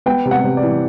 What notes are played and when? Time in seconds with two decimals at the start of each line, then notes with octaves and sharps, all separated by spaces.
0.06 B3 G5
0.25 C3
0.31 F#5
0.44 C3
0.57 D5
0.63 E3